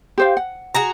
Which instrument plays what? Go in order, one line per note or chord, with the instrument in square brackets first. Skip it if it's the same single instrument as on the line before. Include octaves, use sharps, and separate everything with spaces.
[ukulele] G4 C5 F5
F#5
[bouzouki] F#4 G#4 A#5